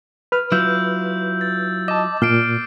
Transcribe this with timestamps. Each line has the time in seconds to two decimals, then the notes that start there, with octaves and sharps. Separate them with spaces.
0.32 B4 F6
0.52 F#3 E4 F4 E6 G6
1.41 A6
1.88 D#5 A5 D6
2.22 A#2 F6 C7 D7